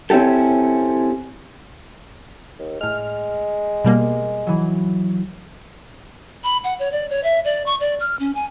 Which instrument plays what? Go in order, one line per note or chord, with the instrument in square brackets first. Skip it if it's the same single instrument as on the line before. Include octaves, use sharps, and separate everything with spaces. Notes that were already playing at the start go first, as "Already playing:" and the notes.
[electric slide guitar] C4 C#4 E4 G4 A4
[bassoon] D#2
[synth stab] A2 F6 [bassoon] G#3
[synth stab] B2 G3 A#3
[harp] E3 F#3
[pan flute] B5
F#5
C#5
D5
C#5
E5
D5
C#6
D5
F6
C#4
G#5